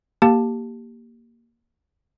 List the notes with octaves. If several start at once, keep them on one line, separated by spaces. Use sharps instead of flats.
A#3 G4 A5